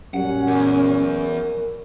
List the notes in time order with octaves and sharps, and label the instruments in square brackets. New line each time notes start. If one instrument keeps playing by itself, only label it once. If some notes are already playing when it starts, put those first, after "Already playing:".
[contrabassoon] F#2 [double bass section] A#2 F#3 C#4 [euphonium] G3 [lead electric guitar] F#5
[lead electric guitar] E2 [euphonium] A#4